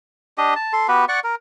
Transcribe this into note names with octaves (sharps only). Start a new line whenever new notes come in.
D4 G4 D#5
A5
A4 C6
B3 F#4 G4 B4
D5 F#5 C#6
A#4